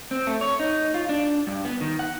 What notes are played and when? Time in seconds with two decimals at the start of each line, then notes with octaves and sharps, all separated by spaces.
0.11 C4
0.27 A3
0.41 C#5
0.59 D#4
0.94 F4
1.09 D4
1.47 G2
1.65 B3
1.81 D#3
1.99 F#5